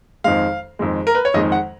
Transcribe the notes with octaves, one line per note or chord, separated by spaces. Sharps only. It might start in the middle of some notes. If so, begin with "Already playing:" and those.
F2 D#3 G#3 F5
F2 D#3 G#3
A#4
B4
C#5
F2 D#3 G#3 D#5
F#5